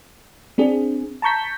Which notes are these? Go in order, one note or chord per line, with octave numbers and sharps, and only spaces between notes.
C4 D4 G#4
A5 A#5 C#6 G6 B6